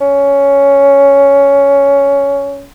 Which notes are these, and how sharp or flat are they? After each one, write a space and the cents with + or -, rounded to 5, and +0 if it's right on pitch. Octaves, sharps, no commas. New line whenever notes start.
C#4 +10